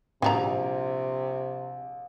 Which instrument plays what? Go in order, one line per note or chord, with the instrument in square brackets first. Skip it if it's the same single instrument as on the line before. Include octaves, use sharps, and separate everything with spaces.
[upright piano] A#1 [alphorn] C3 [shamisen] F#3 G3 A#5 [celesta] G5